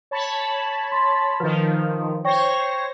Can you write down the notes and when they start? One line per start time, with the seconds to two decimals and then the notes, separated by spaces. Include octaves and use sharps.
0.11 C#5 A5 B5
0.92 C6
1.40 D#3 F3 B4
2.25 C5 C#5 G5 C#6 A#6